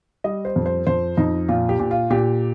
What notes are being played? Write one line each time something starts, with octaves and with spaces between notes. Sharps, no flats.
G3 D#5
C5
F2
C5
F2 C5
F2 D#4
A#2 F4
G4
A#2
F4
A#2 G4